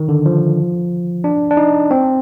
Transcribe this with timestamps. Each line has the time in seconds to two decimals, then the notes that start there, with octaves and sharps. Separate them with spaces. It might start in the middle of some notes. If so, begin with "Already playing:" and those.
Already playing: D#3
0.09 D3
0.26 F3
1.24 D4
1.51 D4
1.57 D#4
1.91 C4